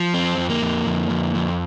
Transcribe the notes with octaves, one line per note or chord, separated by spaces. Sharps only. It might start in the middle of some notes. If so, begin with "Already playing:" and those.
Already playing: F3
F2 C4
F2
A#3
F2
F2
F2
F2